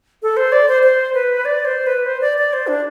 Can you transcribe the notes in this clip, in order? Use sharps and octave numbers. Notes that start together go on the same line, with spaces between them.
A4
C5
D5
C5
C5
B4
D5
C5
B4
C5
D5
D5
C5
D4